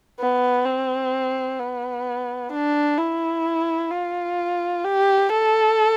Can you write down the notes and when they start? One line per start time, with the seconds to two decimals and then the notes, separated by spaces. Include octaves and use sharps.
0.20 B3
0.66 C4
1.59 B3
2.52 D4
2.98 E4
3.91 F4
4.84 G4
5.30 A4